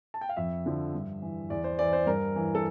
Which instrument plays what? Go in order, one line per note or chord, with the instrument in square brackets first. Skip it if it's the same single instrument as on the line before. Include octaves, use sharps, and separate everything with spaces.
[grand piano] A5
G5
F5
F2 E5
D3 F3
G2
E3
E2 D5
C5
E3 D5
C5
G2 A#4
E3
A4